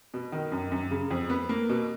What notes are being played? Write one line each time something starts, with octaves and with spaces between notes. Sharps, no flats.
B2
D#3
F#2
F#2
C#3
F2
B3
A#3
B2